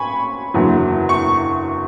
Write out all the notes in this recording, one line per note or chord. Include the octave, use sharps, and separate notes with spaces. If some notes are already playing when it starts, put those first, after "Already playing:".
Already playing: C#4 G#5 B5 C#6
F#1 E2 D3 F#3
C#6